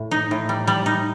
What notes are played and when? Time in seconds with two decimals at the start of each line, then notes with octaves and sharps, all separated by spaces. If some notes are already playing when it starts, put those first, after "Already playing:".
Already playing: A2
0.11 D#4
0.31 A2
0.49 G3
0.67 G3
0.86 D#4